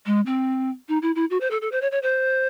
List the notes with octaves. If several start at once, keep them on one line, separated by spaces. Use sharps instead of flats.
G#3
C4
D#4
E4
E4
F#4
C5
A4
A4
C5
C#5
C#5
C5